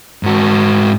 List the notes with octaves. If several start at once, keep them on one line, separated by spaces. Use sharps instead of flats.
G#2 F#4